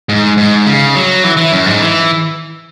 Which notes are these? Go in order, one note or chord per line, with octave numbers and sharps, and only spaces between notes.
G#2
G#2
C#3
F#3
E3
E3
F#2
G#2
E3